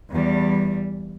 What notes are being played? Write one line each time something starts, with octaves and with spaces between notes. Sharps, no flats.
E2 G3